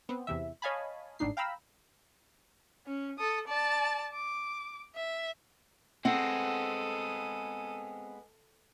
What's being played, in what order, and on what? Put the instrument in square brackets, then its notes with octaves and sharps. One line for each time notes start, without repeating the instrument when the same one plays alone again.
[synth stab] B3 C4
E2 C3 E3 E5
C#5 D#5 F5 G#5 A5 B5
G#1 A2 D4 D#4 C7
F5 G5 A#5 B5 E6
[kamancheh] C#4
A4 D#6
D5 A5
D6
E5
[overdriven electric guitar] G#3 B3 [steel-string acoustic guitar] C4 F#5 [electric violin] A4 D#6